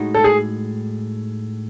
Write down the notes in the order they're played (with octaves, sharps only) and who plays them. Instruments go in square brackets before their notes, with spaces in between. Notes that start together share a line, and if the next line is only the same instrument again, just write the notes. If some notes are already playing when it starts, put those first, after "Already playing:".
Already playing: [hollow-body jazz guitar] A2 G#3 D#4 F#4
[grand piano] A4
G#4